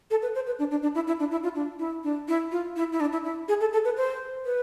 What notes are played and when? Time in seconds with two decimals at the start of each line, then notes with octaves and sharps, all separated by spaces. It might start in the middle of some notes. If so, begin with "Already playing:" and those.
0.11 A4
0.22 B4
0.35 C5
0.47 B4
0.59 D4
0.71 D4
0.82 D4
0.95 E4
1.07 E4
1.20 D4
1.31 E4
1.43 F4
1.55 D4
1.79 E4
2.04 D4
2.28 E4
2.52 F4
2.76 E4
2.93 E4
3.00 D4
3.13 E4
3.24 E4
3.48 G#4
3.61 A4
3.73 A4
3.85 B4
3.97 C5
4.46 B4